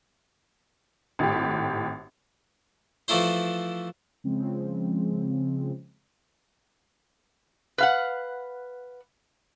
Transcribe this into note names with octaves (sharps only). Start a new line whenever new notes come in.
G#1 A2 G4
E3 F3 A3 E4 C5
C#3 F3 G#3 C4
B4 F5 F#5